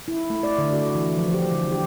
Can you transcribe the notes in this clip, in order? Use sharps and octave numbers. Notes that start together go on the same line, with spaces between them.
E4
A3
D5
D3
F#4
E3
F3
G4
D3
G4